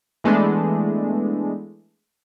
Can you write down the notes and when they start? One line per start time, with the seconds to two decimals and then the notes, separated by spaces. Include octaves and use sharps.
0.24 E3 G#3 A3 B3 D4 E4